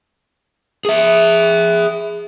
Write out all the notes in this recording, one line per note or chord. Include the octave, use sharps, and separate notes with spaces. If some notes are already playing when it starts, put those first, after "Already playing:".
G#4 E5